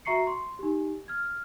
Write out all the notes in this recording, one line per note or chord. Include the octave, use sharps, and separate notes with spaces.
F#4 E5 A#5 C#6 C7 C#7
C6
D#4 G4
F6 G#6